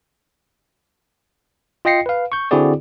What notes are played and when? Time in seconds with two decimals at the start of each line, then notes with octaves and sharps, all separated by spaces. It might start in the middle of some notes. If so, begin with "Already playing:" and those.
1.85 F4 D#5 G5 A#6 C7 C#7
2.06 B4 F5
2.32 C#6 G6
2.51 D3 C4 E4 F#4 G#4 D5